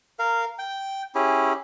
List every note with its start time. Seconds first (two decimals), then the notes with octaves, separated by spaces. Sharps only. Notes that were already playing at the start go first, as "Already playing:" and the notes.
0.19 A#4 F5
0.59 G5
1.15 C#4 E4 G4 G#4